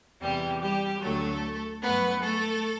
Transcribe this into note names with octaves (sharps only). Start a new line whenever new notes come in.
E2 C3 E3 G3 G4
G3 G4
D2 D3 F#3 A3 A4
G2 F#3 A3 B3 B4
A3 A4